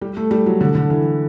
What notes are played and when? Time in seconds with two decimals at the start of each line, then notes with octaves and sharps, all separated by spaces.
0.01 G3
0.17 A3
0.31 G3
0.46 F#3
0.61 D3
0.75 D3
0.90 E3